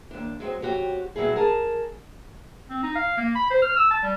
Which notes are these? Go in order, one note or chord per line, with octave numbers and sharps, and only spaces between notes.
D#2 D4
F#3 G#3 C4
F2 A#2 F#4 G4 C#5
B2 F#3 G3 E4 G#4
G#4 A#4 A5
C4
D#4
F5
A#3
B5
C5
F6
E6
A5
G3